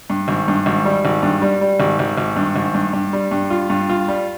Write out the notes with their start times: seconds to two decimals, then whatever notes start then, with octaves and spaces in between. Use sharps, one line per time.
0.10 G2
0.28 G#1
0.48 G2
0.66 G#1
0.85 G3
1.05 G#1
1.23 G2
1.42 G3
1.61 G3
1.80 G#1
1.99 G#1
2.18 G#1
2.36 G2
2.56 G#1
2.74 G2
2.93 G2
3.13 G3
3.31 G2
3.50 F4
3.70 G2
3.89 F4
4.08 G3